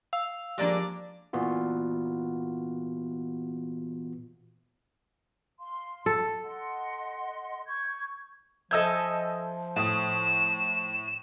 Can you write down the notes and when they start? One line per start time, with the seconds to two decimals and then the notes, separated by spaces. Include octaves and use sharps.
0.13 F5 E6 F7
0.58 F3 G#3 A#3 D4 G4 D5
1.33 A#2 E3 B3 F4 F#4
5.59 F5 C6
6.06 A4
6.43 D#5 F#5 C6
7.66 C#6 G6 G#6
8.71 F3 A4 D#5 E5 G#5 E6 G6
9.76 A2 D#6 E7